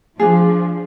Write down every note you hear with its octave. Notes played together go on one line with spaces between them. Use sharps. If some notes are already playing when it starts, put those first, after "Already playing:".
F3 D4 F4 G#4